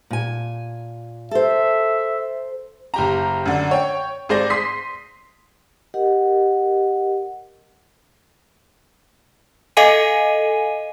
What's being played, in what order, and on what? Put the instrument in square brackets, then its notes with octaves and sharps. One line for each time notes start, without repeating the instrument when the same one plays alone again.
[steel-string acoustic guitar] A#2 G#5
[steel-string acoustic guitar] A4 C5 [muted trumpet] E5
[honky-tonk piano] F#1 G4 A#5
F#2 D3
C#5 G5
G#1 G#4 C5 D5 A#6
C6 D#6 B6 C7
[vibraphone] G4 A#4 D#5 F#5
[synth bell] A4 D#5 F5 G#5 D#7